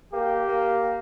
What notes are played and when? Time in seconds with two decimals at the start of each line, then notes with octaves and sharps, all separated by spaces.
0.13 A#3 G4
0.48 A#3